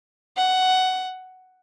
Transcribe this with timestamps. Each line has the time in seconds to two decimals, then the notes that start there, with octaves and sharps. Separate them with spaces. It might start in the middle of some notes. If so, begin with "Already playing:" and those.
0.37 F#5